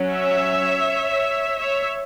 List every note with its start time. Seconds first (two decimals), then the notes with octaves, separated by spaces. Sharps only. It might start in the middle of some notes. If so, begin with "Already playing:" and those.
Already playing: F#3 C#4
0.10 C#5 E5
1.59 C#5 E5